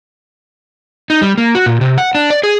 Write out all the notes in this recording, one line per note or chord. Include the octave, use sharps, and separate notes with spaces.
D#4
G3
A#3
F#4
A#2
C3
F#5
D4
D5
G#4